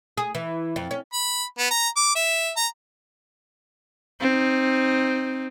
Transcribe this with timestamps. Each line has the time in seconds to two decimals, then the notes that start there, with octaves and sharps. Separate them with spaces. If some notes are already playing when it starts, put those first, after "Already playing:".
0.17 G#4
0.35 E3
0.76 F2
0.91 C#4
1.13 B5
1.59 B3
1.71 A#5
1.96 D6
2.15 E5
2.56 A#5
4.20 C4 D#4